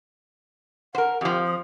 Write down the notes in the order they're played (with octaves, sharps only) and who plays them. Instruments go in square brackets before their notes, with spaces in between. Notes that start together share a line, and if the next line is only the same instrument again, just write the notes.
[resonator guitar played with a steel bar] A#4 C5 [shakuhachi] F#5
[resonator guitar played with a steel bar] F2 F3 [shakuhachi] G4
[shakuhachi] D#6